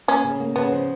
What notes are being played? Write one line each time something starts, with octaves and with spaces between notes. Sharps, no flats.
A#3 C#4
C#3
A#3
C#3 B3
F3